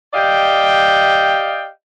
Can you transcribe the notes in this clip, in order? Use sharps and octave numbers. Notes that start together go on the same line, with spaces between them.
G4 D5 D#5 F5 G5